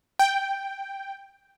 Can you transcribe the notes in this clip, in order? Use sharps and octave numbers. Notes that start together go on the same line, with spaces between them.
G5